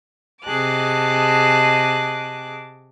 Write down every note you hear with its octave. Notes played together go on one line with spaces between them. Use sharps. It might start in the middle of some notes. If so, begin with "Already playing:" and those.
C3 G#4 D#5 A5 D6 F#6